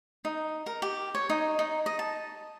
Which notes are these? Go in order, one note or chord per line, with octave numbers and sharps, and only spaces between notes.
D#4
A#4
G4
C#5
D#4
D#4
D#5
A5